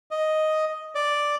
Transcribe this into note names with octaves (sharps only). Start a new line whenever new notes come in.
D#5
D5